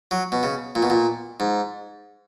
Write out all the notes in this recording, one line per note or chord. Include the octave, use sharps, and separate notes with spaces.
F#3
B2
C#3
A#2
B2
A#2
G#2